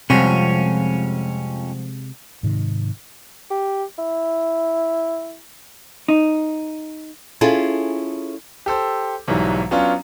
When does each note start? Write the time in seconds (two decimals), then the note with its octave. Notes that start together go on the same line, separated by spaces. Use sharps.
0.10 F2 C3 F3 G3 G#3 C#4 F#4
2.43 G#2 C3 D#3
3.51 G4
3.99 E4
6.08 D#4
7.41 C#4 E4 F4 G#4 A4
8.66 G4 A4 C5
9.28 B1 G#2 E3 F#3 G3
9.71 F#3 B3 C#4 D4 F4